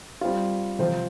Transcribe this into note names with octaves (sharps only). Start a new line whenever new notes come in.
G3 C4 F4
C3 F3 C4 F4 C5